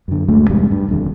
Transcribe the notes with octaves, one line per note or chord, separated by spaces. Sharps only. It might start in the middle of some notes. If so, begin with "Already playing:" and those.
F#2 D3
D2 G#3 A3
E2 G#2 C3 G3
G2
D#1 F2 D3